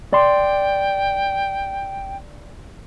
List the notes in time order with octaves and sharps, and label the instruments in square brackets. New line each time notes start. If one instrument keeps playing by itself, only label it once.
[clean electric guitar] D5 C6 [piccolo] G5